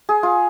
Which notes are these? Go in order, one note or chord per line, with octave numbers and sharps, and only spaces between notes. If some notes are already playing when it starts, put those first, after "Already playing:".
G#4
F4